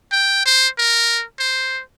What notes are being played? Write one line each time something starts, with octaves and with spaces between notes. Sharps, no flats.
G5
C5
A#4
C5